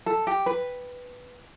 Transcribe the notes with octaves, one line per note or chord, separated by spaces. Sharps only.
A4
G4
B4